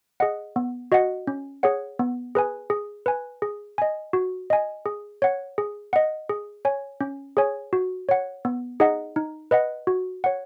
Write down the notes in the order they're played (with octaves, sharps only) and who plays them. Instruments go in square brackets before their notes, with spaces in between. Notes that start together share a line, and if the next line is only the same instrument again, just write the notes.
[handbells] G#4 D#5 F#5
B3
F#4 D#5 F#5
C#4
G#4 C#5 F#5
B3
G#4 B4 G#5
G#4
B4 G#5
G#4
D#5 G#5
F#4
D#5 G#5
G#4
C#5 F#5
G#4
D#5 F#5
G#4
C#5 G#5
C#4
G#4 C#5 G#5
F#4
C#5 F#5
B3
D#4 G#4 D#5 F#5
D#4
B4 D#5 F#5
F#4
C#5 F#5